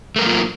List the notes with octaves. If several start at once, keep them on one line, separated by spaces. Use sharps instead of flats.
F#3 A3 A#3 F4 A#4